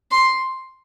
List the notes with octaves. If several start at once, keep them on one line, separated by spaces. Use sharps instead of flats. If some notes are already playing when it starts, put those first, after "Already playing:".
C6